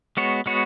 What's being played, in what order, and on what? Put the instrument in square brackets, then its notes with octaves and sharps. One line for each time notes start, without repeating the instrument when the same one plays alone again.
[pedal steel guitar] G#3 B3 F#4 C#5
G#3 B3 F#4 C#5